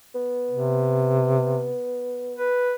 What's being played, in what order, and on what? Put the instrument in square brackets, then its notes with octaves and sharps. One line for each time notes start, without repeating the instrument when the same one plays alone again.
[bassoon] B3
[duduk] C3
B4